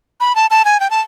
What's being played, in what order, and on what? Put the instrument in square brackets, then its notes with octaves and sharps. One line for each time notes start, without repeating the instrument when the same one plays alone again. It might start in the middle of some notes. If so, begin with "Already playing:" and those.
[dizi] B5
A5
A5
G#5
G5
A5